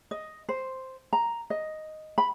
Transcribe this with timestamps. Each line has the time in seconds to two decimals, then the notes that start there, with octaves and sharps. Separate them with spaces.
0.11 D#5
0.49 C5
1.13 A#5
1.50 D#5
2.18 B5